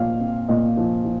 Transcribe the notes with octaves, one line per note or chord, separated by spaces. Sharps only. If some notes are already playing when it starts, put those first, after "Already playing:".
Already playing: A#2 F3 F5
C4
A#2 D#5
F3
F3